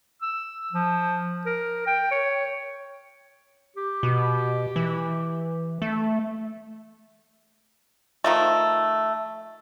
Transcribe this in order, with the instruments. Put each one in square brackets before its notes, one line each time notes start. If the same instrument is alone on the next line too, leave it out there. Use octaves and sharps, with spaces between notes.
[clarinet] E6
F3
A#4
G5
C#5
G4
[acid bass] B2
E3
A3
[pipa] D#3 F3 A3